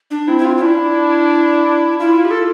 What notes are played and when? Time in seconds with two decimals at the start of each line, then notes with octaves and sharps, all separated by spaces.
0.11 D4
0.28 C4 E4
0.38 E4
0.45 F4
0.57 F4
0.61 D4 E4
1.99 E4 F4
2.25 G4
2.31 A4